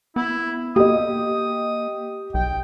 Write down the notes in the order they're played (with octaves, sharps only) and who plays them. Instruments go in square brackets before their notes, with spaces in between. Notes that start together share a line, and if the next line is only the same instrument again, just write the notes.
[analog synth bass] B3 [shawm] E4
[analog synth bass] A#3 [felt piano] G4 D#5 [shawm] D#6
[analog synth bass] B1 [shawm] G5